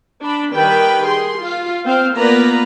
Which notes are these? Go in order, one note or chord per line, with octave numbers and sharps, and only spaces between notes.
D4 B5
D#3 G3 B4 G5 B5
G#4 C6
F4
C4 C5 F5
A#3 B3 F4 B4 D5 A#5